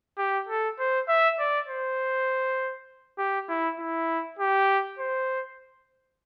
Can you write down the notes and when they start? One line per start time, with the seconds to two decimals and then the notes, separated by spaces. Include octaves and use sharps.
0.18 G4
0.48 A4
0.79 C5
1.08 E5
1.39 D5
1.68 C5
3.18 G4
3.49 E4
3.79 E4
4.39 G4
4.99 C5